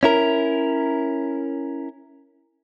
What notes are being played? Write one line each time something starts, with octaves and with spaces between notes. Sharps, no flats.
C#4 E4 A#4